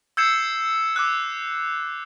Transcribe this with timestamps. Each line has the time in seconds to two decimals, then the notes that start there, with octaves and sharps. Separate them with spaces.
0.17 E6 G6 G#6 C7 C#7 E7
0.96 D6 E6 F#6